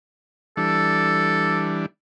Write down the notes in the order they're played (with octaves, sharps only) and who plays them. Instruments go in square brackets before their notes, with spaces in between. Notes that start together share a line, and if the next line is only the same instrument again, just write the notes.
[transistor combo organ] E3 G3 D4 [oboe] A4